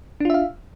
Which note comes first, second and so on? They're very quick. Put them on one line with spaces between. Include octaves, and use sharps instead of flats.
D4 F4 E5 F5